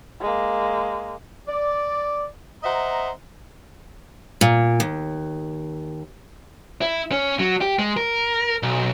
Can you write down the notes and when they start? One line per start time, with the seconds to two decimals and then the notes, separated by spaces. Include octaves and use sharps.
0.21 G#3 A#3
1.47 D5
2.63 C5 D#5 E5 F#5 A#5
4.41 A#2
4.80 D#2
6.81 E4
7.12 C#4
7.39 F#3
7.61 G4
7.79 G#3
7.97 A#4
8.63 B1